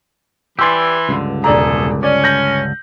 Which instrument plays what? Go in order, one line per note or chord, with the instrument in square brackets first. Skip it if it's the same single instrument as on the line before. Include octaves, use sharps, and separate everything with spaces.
[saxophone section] E3 [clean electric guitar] G4 D5 [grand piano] C6 E6
[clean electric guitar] C#2 G2 D3
[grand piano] E1 D5 A#5 [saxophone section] A3 G#4 A4
[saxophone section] C#4 [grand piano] D5
[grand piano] G6 A#6 F#7